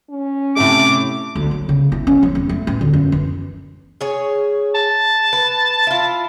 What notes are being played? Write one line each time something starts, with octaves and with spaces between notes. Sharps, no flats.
C#4
A2 C3 A3 D6
D2
F#3
C#3
E4
C#4
F3
F1
A3
A1
D2
F#2
E3
G#4 C#5
A5
B4
E4 F4